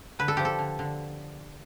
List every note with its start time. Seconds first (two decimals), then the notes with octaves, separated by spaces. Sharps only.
0.19 D3 B4
0.28 A4
0.37 F3 G4
0.45 A4
0.59 D3
0.79 D3